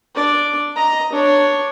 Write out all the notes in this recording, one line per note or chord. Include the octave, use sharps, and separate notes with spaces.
D4 D5
D#5 A#5
D4 C#5